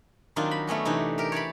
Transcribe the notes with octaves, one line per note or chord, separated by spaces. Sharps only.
D#3 F#3 C4 D4 D#4 F4
B5
A3 B3 C#4 F#4
C3 E3 D4 D#4
G4 A#4
C#5 D5 A5 B5